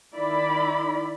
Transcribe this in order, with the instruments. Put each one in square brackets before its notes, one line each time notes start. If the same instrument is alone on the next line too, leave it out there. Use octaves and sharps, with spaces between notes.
[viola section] D#3 E4 D5 B5